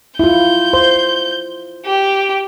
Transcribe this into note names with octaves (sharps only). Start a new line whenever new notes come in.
E4 F4 G6
C5
G4